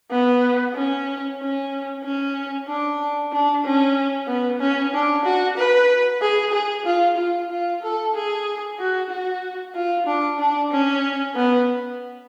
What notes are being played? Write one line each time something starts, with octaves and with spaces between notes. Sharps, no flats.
B3
C#4
C#4
C#4
D4
D4
C#4
B3
C#4
D4
F#4
B4
G#4
G#4
F4
F4
F4
A4
G#4
F#4
F#4
F4
D4
D4
C#4
B3